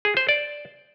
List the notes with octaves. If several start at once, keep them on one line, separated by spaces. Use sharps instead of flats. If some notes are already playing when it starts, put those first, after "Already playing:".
G#4
C5
D5